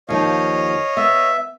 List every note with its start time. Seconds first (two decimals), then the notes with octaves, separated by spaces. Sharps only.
0.09 D#2 F3 D#4 C#5 D#5 F5
0.97 B3 E5